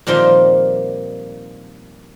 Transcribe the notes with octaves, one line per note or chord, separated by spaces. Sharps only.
A#2 D#3 F3 G3 C4